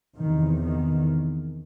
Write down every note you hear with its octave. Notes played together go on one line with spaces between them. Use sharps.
E2 C3 D#3
D#3